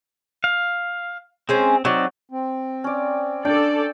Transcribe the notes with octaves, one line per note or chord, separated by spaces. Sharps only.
F5
G#3 C4 C#4 C5
F#3 C4 D#4 D5
C4
C#4 D5
D4 A4 D5 G5